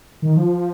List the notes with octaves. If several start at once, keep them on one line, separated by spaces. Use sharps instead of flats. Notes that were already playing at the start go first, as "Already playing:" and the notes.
D#3
F3